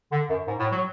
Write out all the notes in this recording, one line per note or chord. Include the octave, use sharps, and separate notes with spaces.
D3
F#2
G#2
A2
F#3